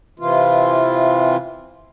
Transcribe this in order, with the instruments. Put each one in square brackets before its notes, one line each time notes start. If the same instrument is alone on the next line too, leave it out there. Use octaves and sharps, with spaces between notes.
[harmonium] C3 E3 F4